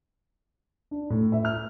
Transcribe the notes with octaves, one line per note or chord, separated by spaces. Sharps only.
D4
A2
E5
F6